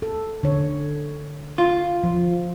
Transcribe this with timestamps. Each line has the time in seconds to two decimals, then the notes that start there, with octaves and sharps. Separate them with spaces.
0.02 A4
0.43 D3 C#5
1.58 F4
2.04 F3